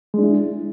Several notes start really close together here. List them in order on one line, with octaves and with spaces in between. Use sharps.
G#3 D4 E4